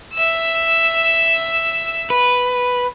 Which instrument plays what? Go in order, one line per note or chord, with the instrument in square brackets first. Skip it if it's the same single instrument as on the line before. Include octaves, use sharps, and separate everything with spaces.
[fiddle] E5 E6
[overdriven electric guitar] B4